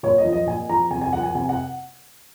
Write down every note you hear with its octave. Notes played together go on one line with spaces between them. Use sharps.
A#2 C#5
D#5
F3
D#5
A#2 G#5
F3 A#5
C3 G#5
G#5
F3 F#5
G#5
C3 G#5
F#5